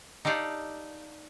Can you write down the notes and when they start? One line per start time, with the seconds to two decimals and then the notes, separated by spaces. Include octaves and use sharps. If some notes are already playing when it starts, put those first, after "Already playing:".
0.25 D#4 G4 A4 D5 F5